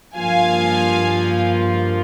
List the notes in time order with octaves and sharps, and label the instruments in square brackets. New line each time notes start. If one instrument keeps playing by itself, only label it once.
[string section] G2 F3 A#3 F4 F5 G#5